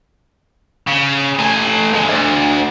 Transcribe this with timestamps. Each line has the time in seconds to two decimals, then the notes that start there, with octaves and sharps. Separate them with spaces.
0.87 C#3
1.39 A3 G#5
1.93 D2 G#3
2.08 D2